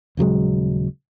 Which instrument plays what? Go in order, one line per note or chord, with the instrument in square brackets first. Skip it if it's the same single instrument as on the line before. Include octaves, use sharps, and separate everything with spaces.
[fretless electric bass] D#1 C#3 F#3 G#3